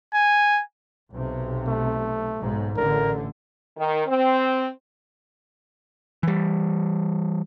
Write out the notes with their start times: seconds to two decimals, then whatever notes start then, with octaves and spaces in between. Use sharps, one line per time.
0.14 G#5
1.11 B1 C3
1.68 A3
2.38 B1 G#2
2.76 A1 D3 A#4
3.78 D#3
4.07 C4
6.23 E3 G3